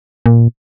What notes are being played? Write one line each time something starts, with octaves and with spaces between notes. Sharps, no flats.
A#2